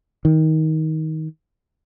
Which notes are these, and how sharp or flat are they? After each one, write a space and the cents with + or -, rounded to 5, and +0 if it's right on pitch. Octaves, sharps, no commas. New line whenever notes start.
D#3 +20